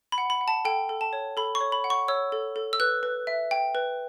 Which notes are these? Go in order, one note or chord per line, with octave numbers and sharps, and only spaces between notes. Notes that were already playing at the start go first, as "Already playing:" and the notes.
B5
F#5
B5
F#5
A5
A4 G5
A4
A5
C#5
A4 B5
C#6
C#5
B5
F#5
C#6
C#5 E6
A4
A4
E6
B4 F#6
B4
E5
G5
B4